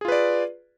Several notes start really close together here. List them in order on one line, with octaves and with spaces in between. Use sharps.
G#4 F4 B4 D5